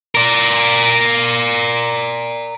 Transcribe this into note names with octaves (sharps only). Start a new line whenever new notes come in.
A#4 D5